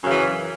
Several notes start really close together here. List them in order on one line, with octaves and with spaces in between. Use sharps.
F#2 C#3 E3